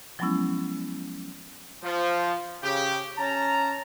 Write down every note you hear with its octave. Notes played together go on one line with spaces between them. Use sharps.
F3 F#3 G#3 B3 C#4 E4
F3
C#3 G4
C#4 A5 A#5